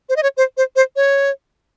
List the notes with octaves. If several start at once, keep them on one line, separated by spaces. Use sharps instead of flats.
C5
D#5
C#5
C5
C5
C5
C#5